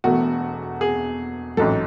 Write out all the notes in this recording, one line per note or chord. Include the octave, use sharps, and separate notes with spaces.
E1 E2 B2 A3 F#4
G#4
A1 G#2 F#3 A4